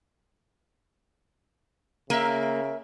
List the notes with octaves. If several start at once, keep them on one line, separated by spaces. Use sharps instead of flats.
C#3 A#3 A#4 E5